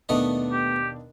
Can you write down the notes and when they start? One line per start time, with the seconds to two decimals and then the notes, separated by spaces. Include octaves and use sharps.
0.09 D#2 B2 A3 B3 D4 D#5
0.52 G4